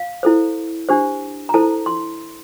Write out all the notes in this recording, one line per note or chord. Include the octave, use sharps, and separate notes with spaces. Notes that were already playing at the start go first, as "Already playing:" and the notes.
Already playing: F5
E4 A4 C5
D4 G4 C5
A#5
E4 A4 C5 A5
C6